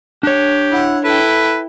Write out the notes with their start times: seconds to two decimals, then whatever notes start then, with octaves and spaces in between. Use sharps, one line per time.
0.23 D4 G4 C#5
0.72 E4 F#5
1.04 E4 A4 B4 G5